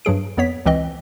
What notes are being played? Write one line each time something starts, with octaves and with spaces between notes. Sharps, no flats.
G2 F#3 G#4 D7
F2 B3 C#5 B6
C#2 E3 C4 D#5